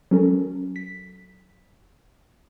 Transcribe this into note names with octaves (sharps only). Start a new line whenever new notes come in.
F#3 C#4 A4 A#4
B6